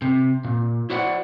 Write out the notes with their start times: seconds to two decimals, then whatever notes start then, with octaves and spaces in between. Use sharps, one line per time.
0.02 C3
0.44 A#2
0.90 E4 F#4 C5 D5 F#5